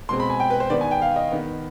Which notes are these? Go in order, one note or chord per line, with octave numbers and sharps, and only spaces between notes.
B2 G#3 C4 C6
B5
G#5
G5
B4
C5
D#3 B3 D5
G#5
G5
F5
D#5
D#3 B3